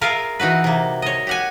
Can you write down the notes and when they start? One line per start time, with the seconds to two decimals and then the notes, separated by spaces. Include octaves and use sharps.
0.01 F4 G#4 A#4 E5 F5
0.40 E3 D#4 F#4 B4
0.64 C3 A#3
1.02 C#5 D#5
1.27 G4 F#5 G#5